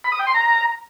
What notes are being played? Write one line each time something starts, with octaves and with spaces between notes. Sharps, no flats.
B5
D#6
G5
C6
A#5